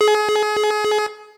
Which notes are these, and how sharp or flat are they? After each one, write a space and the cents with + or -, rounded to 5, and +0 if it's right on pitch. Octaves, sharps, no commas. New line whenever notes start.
G#4 +30